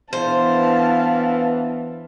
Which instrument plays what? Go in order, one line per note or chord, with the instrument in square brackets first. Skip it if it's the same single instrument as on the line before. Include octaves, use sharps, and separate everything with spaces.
[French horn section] E3 B3 D4 [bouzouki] C5 [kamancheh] F5 A5